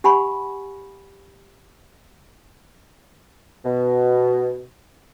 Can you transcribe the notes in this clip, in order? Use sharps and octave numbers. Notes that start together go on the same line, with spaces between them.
G4 F#5 G#5 B5 C#6
B2